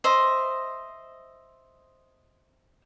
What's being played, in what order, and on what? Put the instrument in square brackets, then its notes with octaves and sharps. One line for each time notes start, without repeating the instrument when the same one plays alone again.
[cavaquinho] C5 D#5 E5